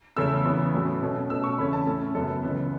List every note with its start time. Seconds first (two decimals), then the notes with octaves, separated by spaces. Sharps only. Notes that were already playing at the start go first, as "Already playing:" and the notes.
0.16 E2 C#3 A3 C#4 E6
0.45 E2 C#3 E3 B3
0.74 A2 F#3 A3 C#4
1.01 B2 A3 C#4
1.30 B2 A3 C#4 E6
1.44 C#6
1.58 E2 C#3 A3 C#4 B5
1.73 A5
1.87 A2 A3 C#4
2.15 F#2 C#3 F#3 B3 A4
2.43 C#2 C#3 E3 B3